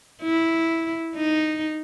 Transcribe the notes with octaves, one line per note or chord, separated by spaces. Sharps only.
E4
D#4